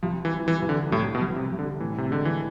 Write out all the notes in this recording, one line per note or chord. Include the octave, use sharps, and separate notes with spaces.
C2 F3
E3
F3
E3
C2
D3
C2 A2
B2
C2
C3
C2
D3
A2 E3
C3
D3 G#3
E3